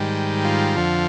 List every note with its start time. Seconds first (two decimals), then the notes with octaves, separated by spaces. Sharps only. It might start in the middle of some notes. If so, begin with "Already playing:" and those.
Already playing: G#2 D#3 G3
0.45 F4
0.77 F2 D3 F3